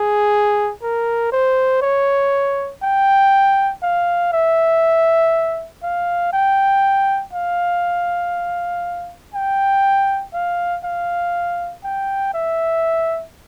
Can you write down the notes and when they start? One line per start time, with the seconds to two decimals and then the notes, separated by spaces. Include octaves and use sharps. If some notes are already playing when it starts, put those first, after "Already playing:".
Already playing: G#4
0.82 A#4
1.32 C5
1.82 C#5
2.83 G5
3.83 F5
4.33 E5
5.83 F5
6.33 G5
7.34 F5
9.34 G5
10.34 F5
10.84 F5
11.84 G5
12.34 E5